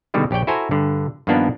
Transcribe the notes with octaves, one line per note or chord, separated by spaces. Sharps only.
B2 D3 D#3 G3 G#3
A#1 G4 C#5 D5 G5
E4 F#4 A4 C5 G#5 A#5
G2 D3
G2 D#3 F3 A#3 B3 D4